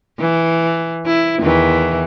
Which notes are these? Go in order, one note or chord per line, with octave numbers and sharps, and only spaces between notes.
E3
E4
E2 D#3 E3